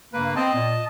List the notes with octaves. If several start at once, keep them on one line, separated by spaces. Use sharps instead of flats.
G2 C#3 A#3 B4
C4 D#5 A5
A#2